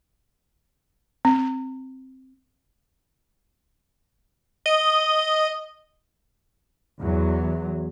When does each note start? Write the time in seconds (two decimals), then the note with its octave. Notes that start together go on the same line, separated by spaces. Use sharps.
1.25 C4
4.66 D#5
7.01 E2 F#3